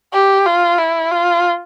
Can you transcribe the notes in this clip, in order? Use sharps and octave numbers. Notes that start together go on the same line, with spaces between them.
G4
F4
E4
F4